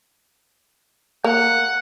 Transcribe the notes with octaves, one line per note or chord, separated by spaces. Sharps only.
A#3 F#5